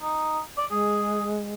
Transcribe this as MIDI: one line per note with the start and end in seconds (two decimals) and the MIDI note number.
0.02 0.39 63
0.58 0.66 74
0.71 1.54 56
0.71 1.26 68